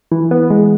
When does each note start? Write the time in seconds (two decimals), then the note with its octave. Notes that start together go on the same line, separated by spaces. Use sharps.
0.11 E3
0.31 B3
0.50 G#3